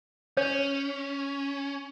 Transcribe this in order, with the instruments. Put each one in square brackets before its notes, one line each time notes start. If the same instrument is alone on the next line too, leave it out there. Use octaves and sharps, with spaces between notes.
[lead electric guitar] C#4 [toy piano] C#5